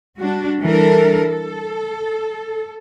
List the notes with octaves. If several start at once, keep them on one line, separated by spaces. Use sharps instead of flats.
G3 D4 F#4
E3 G3 D4 A4 A#4
A4